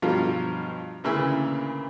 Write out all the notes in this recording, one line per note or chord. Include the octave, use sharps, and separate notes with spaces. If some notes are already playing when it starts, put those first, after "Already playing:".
G2 B2 F3 F#3 F4
D2 A#2 C#3 E3 E4 E6